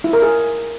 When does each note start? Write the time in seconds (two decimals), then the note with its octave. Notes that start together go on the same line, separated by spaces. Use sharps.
0.04 E4
0.13 A#4
0.22 G#4